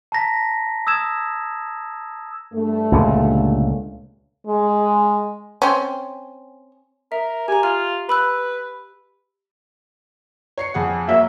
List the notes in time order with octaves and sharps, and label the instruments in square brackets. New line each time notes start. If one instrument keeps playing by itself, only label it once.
[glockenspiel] A5 A#5 A#6 B6
D#6 E6 G#6 E7
[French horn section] G2 A3
[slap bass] C#2 A#2 D3
[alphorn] G#3
[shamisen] C4 C#4
[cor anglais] A#4 [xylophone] E5
[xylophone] G4 A#5 [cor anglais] G#5
[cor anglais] F4 [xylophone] F6
[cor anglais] B4 [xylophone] B5 E6 F#6
[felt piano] C#5 C7 C#7
F2 G#4 F#5
[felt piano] F#3 A#3 C#5 [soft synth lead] E5